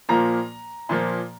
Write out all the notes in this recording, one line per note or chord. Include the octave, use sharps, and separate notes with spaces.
A#2 F3 A#3 A#5
A#2 F3 A#3